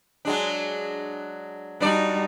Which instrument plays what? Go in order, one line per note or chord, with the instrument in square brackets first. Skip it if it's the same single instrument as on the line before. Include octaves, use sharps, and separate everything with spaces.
[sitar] F#3 G#3 D4
[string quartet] G3 D#4 F#4 [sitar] D4 D5